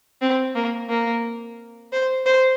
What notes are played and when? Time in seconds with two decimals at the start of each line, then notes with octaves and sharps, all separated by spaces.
0.21 C4
0.55 A#3
0.89 A#3
1.93 C5
2.26 C5